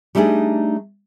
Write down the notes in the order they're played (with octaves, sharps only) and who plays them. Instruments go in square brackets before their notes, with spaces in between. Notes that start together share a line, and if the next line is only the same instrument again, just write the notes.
[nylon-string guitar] G3 A3 D4 D#4 G#4